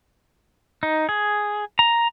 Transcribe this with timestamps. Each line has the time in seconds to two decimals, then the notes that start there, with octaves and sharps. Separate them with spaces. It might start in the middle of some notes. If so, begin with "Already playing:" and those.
0.83 D#4
1.09 G#4
1.79 A#5